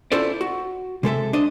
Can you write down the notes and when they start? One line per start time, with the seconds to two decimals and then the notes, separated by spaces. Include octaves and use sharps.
0.12 C#4 E4 F4 A4 C5 D5
0.41 F#4
1.03 C3 G#3 A4 E5
1.33 D4 C5 D#5